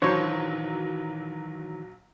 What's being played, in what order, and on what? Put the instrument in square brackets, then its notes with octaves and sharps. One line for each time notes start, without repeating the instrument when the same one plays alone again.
[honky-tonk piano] A#1 F#3 [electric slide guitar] D#3 E3 [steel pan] D4 C5 C#5